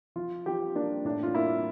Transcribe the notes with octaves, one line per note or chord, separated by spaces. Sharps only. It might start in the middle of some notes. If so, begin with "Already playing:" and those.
F3 F4
F3 G4
A#3 D4
A2 D4
F4
A#3 E4